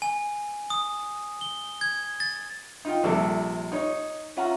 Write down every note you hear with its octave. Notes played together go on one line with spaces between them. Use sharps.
G#5
D#6
G7
G#6
A6
D#4 F4 G5
A#1 C3 G3 A4 E5
D#4 C#5
C#4 F4 E5 F#5 A#5